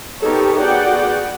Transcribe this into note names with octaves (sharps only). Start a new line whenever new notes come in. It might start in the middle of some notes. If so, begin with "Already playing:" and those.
B3 D#4 G4 A4 A#4 C#5
B3 F#4 G#4 D5 F#5 G5